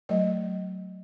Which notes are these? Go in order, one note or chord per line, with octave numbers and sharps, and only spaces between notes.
F#3 A3 D5 D#5